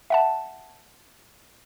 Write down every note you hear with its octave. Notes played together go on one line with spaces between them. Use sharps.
E5 F#5 A5